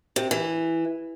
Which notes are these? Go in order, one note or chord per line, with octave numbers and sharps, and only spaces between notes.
C3
E3